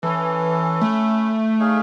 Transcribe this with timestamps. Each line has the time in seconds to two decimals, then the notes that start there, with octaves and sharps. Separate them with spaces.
0.03 E3 C#4 E4 A4
0.81 A3
1.59 D#4 G#4 C#5 F5